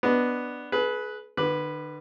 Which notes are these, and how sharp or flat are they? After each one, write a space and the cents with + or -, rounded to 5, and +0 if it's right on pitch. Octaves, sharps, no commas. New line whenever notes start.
B3 +0 D4 +0 D#5 +0
G#4 +35 B4 -5
D3 +45 B4 +0 D6 +0